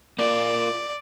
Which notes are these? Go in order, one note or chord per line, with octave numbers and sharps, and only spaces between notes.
A#3 F4 D5